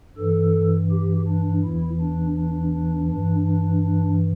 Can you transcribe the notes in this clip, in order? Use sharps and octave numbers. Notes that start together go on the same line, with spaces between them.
G2 E3 A4
G4
D4
E2 E3 E4
D4
D4
D4
G2 E3 D4
D4
D4